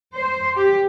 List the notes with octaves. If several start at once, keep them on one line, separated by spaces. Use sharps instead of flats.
C5
G4